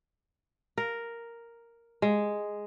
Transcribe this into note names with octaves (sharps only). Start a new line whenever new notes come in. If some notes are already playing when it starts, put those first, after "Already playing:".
A#4
G#3